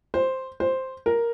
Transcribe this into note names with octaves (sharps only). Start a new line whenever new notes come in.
C5
C5
A#4